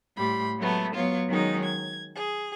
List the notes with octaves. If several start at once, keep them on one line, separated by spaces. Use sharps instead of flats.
A2 G3 B5 C6
F#3 G#3 A3 B3 A4
F#3 B3 F4 C#5
D#3 F#3 G#3 C#4 D#4
G#6
G#4